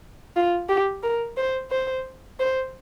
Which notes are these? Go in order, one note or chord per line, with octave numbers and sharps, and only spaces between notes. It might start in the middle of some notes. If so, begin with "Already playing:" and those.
F4
G4
A#4
C5
C5
C5